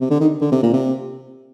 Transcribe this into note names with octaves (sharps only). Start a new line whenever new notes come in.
C3
D3
D#3
D3
C3
A#2
C3